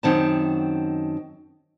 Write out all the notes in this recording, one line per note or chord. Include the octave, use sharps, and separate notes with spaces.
F#2 D#3 C4 A5